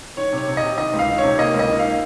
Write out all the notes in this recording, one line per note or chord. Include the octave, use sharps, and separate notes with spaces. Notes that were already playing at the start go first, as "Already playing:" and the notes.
D#3 C#5
C3
C#5
C3
D#5
C3
D#3 D#5
C#2
F5
D#3
C#5
C3
A#3 D#5
C#2
D#5
D#3
A#3 F5